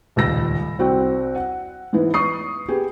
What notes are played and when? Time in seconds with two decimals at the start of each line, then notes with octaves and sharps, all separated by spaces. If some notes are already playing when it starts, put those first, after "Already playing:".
0.16 D#1 C#2 E6 A#6
0.79 C2 C4 F#4 G5
1.36 F#5
1.93 G#2 E3 B3
2.14 C#6 D#6 C7
2.69 B3 G4 G#4